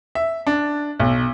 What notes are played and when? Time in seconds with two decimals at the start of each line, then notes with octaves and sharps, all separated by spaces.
0.15 E5
0.47 D4
1.00 B1